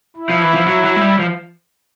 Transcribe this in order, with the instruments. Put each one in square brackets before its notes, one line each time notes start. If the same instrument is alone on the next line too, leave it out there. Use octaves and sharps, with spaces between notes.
[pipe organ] E4
[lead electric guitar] F3
E3
F3
F#3
F#3
G#3
G3
F3